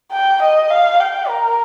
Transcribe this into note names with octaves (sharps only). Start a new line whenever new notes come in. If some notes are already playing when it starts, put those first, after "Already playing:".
G5
D#5
F5
G5
A#4